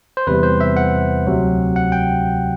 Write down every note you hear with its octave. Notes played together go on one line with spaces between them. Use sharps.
C5
E2 C3 E3 G3 B4
C5
E5
F#5
D2 C3 F#3
F#5
G5